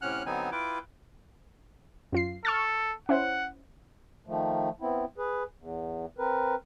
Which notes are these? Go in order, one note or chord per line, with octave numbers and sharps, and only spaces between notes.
A2 C3 C#4 F#5 F6 F#6
D3 F#3 B3 C4 D#4 G#5
E4 F4 B4 G5 D6
F#2 F4 C7
A4 C#6 F6 A6
C#4 E4 C5 F#5
D#3 F3 A3
B3 C4 E4
G#4 B4
E2
C4 A#4 B4